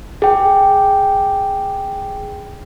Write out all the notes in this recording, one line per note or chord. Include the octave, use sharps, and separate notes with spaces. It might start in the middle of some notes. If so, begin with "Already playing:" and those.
G#4 G5